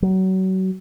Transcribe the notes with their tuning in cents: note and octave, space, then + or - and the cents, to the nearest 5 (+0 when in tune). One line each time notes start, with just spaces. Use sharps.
F#3 +30